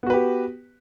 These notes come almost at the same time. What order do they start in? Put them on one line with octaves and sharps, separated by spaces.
B3 F#4 B4 G4